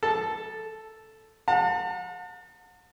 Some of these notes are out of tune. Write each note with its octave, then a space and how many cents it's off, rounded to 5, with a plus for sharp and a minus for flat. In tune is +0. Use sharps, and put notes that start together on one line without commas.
A4 +0 A5 +0
F#5 -40 A5 +40